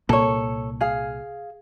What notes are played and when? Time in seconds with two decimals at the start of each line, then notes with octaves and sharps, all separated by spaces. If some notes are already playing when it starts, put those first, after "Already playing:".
0.09 C2 A#2 A#3 A4 C#5
0.81 G#4 F5